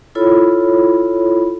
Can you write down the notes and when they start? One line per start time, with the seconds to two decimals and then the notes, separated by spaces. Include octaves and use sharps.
0.15 E4 F4 A4 C#5 B5